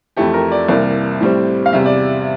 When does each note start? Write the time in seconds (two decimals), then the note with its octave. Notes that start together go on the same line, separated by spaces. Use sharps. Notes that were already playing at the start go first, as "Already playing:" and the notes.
0.17 F2 E3 A3 G4
0.34 A#4
0.52 D5
0.68 C2 C3 E3 A#3 D5
1.21 A2 G3 C4
1.66 F5
1.73 E2 C3 G3 E5
1.86 D5